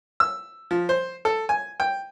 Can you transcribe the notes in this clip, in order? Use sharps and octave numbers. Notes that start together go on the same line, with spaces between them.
E6
F3
C5
A4
G#5
G5